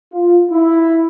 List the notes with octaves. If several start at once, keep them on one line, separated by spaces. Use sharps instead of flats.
F4
E4